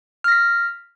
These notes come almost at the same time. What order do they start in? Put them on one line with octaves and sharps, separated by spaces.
F6 A#6 B6